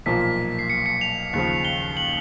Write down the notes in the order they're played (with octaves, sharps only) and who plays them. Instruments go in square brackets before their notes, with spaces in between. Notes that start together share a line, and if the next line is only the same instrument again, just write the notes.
[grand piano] B1 A#2 F3 A#3 [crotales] B6
[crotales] B6
C7
C#7
C#7
F7
[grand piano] D#2 C#3 F3
[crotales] G7
F#7